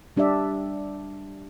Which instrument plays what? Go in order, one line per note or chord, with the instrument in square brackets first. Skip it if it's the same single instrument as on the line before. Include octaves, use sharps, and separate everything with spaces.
[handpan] G3 D4 G4 D5 E5